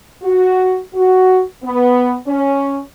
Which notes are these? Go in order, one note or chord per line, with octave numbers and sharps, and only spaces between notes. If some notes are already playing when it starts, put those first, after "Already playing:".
F#4
F#4
B3
C#4